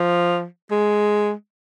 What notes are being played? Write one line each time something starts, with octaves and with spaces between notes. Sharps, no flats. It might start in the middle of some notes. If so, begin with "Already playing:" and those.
Already playing: F3
G#3